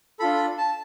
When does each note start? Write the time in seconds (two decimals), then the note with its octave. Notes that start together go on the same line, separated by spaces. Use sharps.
0.20 D4 F4 A4 B5
0.58 A5